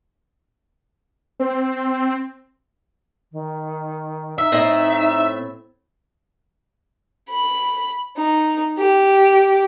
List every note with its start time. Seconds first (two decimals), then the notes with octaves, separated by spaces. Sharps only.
1.40 C4
3.32 D#3
4.38 D#4 E5
4.52 A2 C4 D#4 D#5
7.30 B5
8.17 D#4
8.78 G4